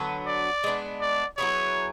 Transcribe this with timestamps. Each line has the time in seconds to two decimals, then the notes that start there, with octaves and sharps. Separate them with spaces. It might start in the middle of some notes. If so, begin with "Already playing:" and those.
Already playing: D3 F#3 B3
0.27 D5
0.64 G#3 B3 D4
1.01 D5
1.37 F#3 B3 E4 G#4 C#5